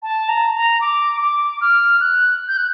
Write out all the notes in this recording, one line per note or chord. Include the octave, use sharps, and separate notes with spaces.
A5
A#5
A#5
D6
D6
F6
F#6
G6
F#6